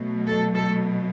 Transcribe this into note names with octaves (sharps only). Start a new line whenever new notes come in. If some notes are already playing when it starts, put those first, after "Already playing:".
Already playing: B2 F#3 A3
A4
A4